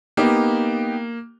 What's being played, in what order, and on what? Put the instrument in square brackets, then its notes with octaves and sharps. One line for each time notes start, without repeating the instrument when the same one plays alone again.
[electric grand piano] A#3 [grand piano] B3 D#4 G4